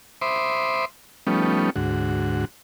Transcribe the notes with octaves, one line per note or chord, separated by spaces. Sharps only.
C5 E5 B5 C6 D6 D#6
F3 G3 A3 B3 C#4 D#4
D2 G#2 F#4